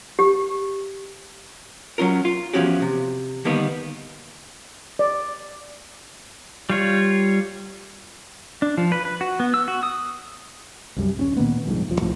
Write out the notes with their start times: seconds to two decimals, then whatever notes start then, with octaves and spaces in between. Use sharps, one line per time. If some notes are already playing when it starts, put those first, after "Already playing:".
0.19 G4
1.98 F#3 C#4 F4 A#4
2.25 F4
2.53 E2 B2 F3 C#4 F#4 G4
2.82 C3
3.45 D3 D#3 G3 A#3 B3
4.99 D5
6.70 G3 F4 C#5
8.62 D4
8.77 F3
8.92 B4
9.05 B4
9.21 F#4
9.40 B3
9.54 E6
9.68 F#4
9.83 D#6
10.96 C2 F#2 G3
11.17 D1 C4 C#4
11.37 A#2 D#3 A#3 B3
11.65 C2 F2 G#2
11.89 D#1 F3
12.01 C2 A2 F3